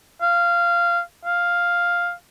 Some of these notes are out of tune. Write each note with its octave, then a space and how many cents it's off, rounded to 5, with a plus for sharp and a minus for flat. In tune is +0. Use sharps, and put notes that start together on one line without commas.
F5 -15
F5 +0